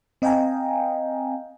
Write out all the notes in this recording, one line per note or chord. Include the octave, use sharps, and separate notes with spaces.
C4 D#5 F5 G5 G#5 A#5